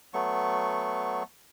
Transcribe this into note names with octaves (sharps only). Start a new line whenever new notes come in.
F#3 A3 B3 C#6